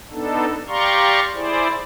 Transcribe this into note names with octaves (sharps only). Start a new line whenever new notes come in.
B3 D4 D#4 A4
G4 D5 F5 A#5 C6 C#6
E4 G#4 C5 D5